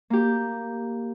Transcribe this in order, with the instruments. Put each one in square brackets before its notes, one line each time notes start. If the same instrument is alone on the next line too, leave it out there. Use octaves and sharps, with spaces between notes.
[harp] A#3 G4